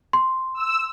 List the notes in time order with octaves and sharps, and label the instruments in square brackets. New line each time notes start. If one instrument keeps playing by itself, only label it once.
[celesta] C6
[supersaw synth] E6